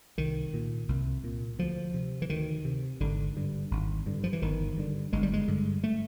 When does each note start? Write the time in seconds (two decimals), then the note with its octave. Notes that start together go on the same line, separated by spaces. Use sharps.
0.18 C2 D#3
0.54 A#2
0.88 C2
1.24 A#2
1.59 D2 F3
1.94 C3
2.22 E3
2.30 D2 D#3
2.65 C3
3.00 G#1 D3
3.36 G2 D3
3.71 G#1
4.06 G2 D3
4.24 F3
4.33 E3
4.42 G1 D#3
4.77 G2 D3
5.13 G1 G#3
5.23 G3
5.33 G#3
5.48 G2 D3
5.84 A3